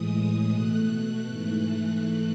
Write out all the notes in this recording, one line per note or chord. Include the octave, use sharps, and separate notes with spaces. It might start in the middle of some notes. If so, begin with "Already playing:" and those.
Already playing: A2 E3 G#3 D#6
B2 A3 F#6
G#2 E3 A3